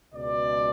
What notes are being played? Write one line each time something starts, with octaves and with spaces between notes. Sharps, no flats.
C#2 B2 D5